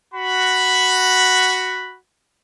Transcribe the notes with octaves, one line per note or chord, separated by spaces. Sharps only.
F#4 B5